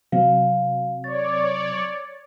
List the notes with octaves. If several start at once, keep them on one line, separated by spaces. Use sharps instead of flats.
C3 F#3 C4 F5
C#5 D5 A6